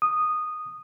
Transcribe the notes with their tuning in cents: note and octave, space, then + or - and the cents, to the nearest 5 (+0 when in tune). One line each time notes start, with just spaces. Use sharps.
D#6 -10